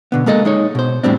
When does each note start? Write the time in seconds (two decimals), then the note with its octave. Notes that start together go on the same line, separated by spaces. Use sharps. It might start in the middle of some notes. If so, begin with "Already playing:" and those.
0.12 B2 D3 B3
0.26 G#3 A#3 A4 D#5
0.45 G#3 D#4 C#5
0.75 B2 C5
1.03 E2 A2 G3 C4 D4